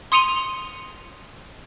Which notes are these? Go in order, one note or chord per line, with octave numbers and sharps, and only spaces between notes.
C6 D#6 C#7 D#7 F7 G7